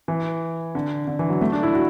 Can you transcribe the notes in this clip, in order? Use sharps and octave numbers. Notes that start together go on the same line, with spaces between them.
E3
D3
D3
E3
F#3
A3
D4
E4
F#4